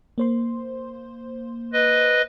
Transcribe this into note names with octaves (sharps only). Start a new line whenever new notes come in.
A#3 C5 C6
B4 D#5